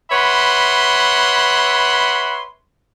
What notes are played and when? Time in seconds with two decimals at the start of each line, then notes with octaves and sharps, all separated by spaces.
0.11 B4 C#5 E5 F#5 B5 C6